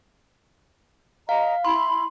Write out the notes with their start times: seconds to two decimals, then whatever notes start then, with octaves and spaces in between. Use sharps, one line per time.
1.29 D#5 F5 A#5
1.65 E4 B5 C6